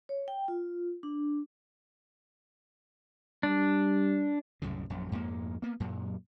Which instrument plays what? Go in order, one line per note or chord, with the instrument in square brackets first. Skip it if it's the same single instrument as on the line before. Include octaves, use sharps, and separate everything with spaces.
[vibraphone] C#5
G5
F4
D4
[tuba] G3 [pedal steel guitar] D4
[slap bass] C2 F#2 A2 C#3
A#1 F#2
F2 G#2 G#3 A#3
A#3 B3
F#2 A#2 F#3